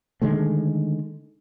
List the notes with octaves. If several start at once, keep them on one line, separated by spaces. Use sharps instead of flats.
D3 D#3 G#3 A3